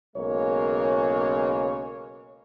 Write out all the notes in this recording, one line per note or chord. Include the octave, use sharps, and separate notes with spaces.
B1 C#3 G#3 A#3 C#5